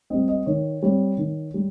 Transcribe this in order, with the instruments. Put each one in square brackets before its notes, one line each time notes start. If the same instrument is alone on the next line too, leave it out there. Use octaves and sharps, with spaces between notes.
[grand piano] G3 C4 D#5
D#5
D#3 C#5
G3 C4 C#5
D#3
G3